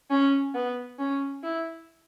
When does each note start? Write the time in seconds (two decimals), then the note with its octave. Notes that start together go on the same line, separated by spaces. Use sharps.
0.10 C#4
0.55 B3
0.99 C#4
1.43 E4